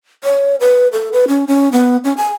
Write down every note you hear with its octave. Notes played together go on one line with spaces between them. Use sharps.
C#5
B4
A4
B4
C#4
C#4
B3
C#4
G#5